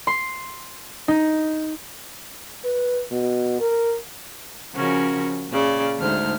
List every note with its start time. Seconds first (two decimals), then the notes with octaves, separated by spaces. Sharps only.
0.07 C6
1.08 D#4
2.65 B4
3.11 B2
3.60 A#4
4.75 C#3 F3 C#4 F#4 A#4
5.50 A#2 C#3 D5
5.99 D2 G#2 A3 D#4 C5 F6